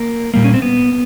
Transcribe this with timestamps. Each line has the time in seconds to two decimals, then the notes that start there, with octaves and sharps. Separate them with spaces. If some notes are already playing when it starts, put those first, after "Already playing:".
Already playing: A#3
0.34 A#2 G3 A#3
0.44 C#4
0.54 C4
0.62 B3